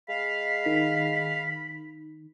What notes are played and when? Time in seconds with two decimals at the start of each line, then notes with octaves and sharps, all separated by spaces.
0.09 G#3 F5 B5
0.66 D#3